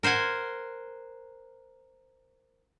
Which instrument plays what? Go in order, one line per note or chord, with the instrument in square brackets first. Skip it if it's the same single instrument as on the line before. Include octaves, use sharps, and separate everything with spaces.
[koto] A#4 C5 F#5 G#5